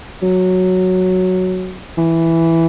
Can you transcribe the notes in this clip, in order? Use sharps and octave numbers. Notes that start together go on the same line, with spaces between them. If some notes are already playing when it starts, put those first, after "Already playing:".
F#3
E3